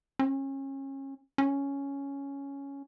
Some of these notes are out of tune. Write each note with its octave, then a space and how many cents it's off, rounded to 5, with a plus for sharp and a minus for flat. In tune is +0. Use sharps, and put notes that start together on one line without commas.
C#4 -30
C#4 +5